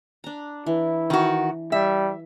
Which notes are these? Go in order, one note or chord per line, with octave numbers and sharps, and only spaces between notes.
D4 A#5
E3 E4
D#3 F#4
G3 E5